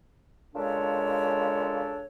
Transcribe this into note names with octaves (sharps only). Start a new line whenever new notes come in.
A#2 C#3 G#3 D4 A4 C#5